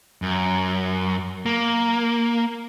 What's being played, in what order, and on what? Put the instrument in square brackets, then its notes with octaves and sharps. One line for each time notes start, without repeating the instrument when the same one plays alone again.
[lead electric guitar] F#2
A#3